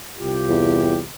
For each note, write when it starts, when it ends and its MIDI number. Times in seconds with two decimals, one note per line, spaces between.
0.19 1.03 36
0.19 1.03 65
0.19 1.03 67
0.49 1.00 40